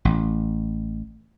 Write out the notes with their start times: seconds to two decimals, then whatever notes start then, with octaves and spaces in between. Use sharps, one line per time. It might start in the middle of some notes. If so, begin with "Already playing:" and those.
0.05 A1